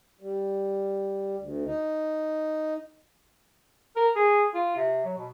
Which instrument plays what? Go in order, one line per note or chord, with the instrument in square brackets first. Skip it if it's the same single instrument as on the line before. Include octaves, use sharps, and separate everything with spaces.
[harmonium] G3
D2
D#4
[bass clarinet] A#4
G#4
F4
C3
F#3
B2